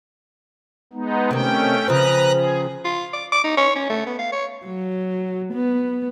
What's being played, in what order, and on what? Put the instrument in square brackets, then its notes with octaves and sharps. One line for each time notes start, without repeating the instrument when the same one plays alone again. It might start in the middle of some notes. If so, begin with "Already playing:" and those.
[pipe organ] G#3 B3 D#4
[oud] C3 D#3 [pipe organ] A3 C#4 G5
[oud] C#3 F3 C4 [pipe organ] B4 A#5 F#6
[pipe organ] G#4
[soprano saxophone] F4
D6
D6
D#4
C#5
C#4
A3
B3
F5
C#5
[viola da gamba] F#3
B3